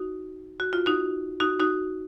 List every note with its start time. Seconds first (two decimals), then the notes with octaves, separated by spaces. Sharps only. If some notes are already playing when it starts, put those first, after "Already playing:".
Already playing: D#4 F#4
0.60 F#4
0.73 F4
0.86 D#4 F#4
1.40 D#4 F#4
1.59 D#4 F#4